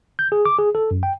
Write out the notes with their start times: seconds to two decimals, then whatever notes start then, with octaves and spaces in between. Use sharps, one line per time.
0.19 G6
0.32 G#4
0.45 D6
0.59 G#4
0.75 A4
0.91 F#2
1.03 G5